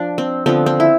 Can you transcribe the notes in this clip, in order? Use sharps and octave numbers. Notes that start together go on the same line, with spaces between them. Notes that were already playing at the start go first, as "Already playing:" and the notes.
Already playing: F3 D4
C4
D3 F3 B3 C4
C4
E4